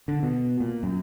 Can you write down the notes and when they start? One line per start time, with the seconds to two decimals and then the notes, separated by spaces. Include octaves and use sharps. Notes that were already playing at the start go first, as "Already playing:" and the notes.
0.08 D3
0.23 B2
0.60 A#2
0.83 F#2